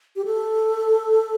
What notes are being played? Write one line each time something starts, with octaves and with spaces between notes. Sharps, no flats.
G4
A4